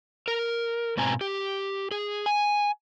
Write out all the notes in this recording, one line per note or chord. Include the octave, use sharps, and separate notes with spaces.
A#4
G#2 B2 C4 G#5 A#5
G4
G#4
G#5